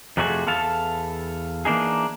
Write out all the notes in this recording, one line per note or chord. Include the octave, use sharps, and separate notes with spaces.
F2 C3 A3 C4 F#4 G#4
E2 E4 A4 F5 A5
E3 A#3 D4 D#4 G#4